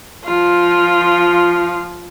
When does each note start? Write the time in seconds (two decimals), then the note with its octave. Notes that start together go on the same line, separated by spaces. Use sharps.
0.24 F3 F4